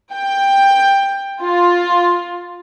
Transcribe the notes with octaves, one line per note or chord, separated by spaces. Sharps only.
G5
F4